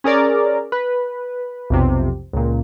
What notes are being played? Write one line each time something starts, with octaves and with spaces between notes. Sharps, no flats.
C#4 G#4 A#4 D5
B4
B1 F2 C3
C#2 A#2